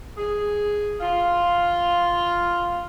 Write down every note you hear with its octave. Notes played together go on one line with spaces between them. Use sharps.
G#4
F4